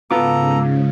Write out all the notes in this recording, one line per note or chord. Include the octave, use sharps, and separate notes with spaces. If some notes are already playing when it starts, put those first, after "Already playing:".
G#2 C#3 B3 F4 A4 A#5 D6